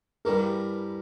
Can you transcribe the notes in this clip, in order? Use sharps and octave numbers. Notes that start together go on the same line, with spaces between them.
G2 E3 G3 A#4